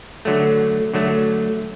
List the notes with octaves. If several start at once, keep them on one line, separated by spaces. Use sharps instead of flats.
D3 F#3 A3
D3 F#3 A3